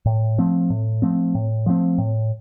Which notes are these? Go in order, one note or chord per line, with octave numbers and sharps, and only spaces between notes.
A2
F3 A3 C4
A2
F3 A3 C4
A2
F3 A3 C4
A2